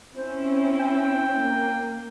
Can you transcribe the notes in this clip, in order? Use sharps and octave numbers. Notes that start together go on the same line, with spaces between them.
C4 C#4 E4 C5
G5
A#3